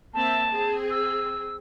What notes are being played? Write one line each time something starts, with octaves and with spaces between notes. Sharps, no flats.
A#3 C4 E5 A5
C4 G#4
E6